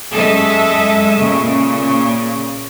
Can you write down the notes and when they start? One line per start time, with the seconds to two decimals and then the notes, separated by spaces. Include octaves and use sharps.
0.12 F#2 G#3 A4 D#5 E5
1.18 A#2 C#3